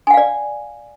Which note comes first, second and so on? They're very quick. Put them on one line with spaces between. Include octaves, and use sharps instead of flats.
G#5 F#5 F5 D5